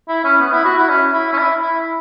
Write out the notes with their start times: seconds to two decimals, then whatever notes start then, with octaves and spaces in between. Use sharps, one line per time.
0.08 E4
0.24 C#4
0.40 B3
0.52 E4
0.65 F#4
0.77 E4
0.89 C#4
1.13 E4
1.33 C#4
1.38 E4
1.61 E4